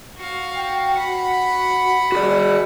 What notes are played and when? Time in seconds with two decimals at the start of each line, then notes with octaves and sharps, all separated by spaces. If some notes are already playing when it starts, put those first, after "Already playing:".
0.17 F#4 F5
0.56 G5
0.94 F#4 F#5 B5
2.12 F#4 G#4 D5